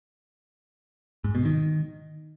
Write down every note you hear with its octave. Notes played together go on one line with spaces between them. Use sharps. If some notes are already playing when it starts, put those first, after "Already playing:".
G#2
B2
D#3